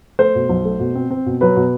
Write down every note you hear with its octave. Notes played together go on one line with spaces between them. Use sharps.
A3 C5
B2
B1
A3
B2
C4
C4
B2
F#3 B4
B2